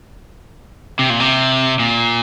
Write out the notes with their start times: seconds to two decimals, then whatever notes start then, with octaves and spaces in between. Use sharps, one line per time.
0.99 C3
1.10 A#2
1.20 C3
1.79 A#2